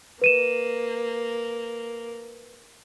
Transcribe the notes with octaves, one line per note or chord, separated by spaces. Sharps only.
A#3 B4 D#7 E7